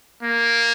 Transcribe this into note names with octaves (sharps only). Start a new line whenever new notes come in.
A#3